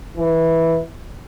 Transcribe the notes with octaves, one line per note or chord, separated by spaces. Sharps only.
E3